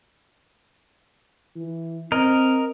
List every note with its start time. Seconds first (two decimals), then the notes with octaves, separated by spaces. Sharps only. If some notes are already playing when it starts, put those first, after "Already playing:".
1.56 E3
2.12 C4 A#4 D#5